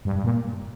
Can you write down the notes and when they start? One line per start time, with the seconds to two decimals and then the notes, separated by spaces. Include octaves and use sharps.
0.05 G2
0.16 G2
0.24 A#2